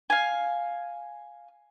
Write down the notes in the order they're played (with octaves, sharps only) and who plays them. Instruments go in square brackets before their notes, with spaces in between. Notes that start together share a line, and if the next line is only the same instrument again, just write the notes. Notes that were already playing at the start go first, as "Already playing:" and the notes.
[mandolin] F5 G#5